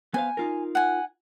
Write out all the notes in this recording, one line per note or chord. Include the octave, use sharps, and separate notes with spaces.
B3 C5 F5 G#5
D#4 F4 A#4
F#5 G#5